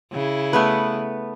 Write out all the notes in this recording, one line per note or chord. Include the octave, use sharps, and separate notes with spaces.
C#3 E4
A3 B3 B4